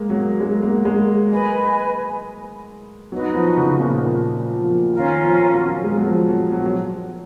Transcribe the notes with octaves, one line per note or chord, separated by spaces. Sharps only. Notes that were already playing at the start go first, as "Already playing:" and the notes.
Already playing: G#3 A#3
F#3
G#3
A#3
G#3
B4 D#5 G#5 B5
F#3 D#4 F#4 B4 D#5
F3
C#3
A#2
A#2
F3
D#3 C#4 F4 A#4
F3
F#3
G#3
F#3
F3
F#3
F#3
F#3